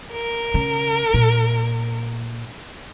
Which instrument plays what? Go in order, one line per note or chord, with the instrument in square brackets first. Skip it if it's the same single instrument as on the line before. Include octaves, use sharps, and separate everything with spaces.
[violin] A#4
[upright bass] C#3
A#2